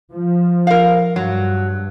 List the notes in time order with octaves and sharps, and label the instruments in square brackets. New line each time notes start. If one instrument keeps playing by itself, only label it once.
[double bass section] F3
[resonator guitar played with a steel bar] A#4 F5
[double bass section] G2 [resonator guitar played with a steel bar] F#3